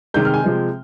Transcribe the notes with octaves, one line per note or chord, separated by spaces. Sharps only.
C3 D#3 G#3 G6
F6
G#5
C3 F3 G#3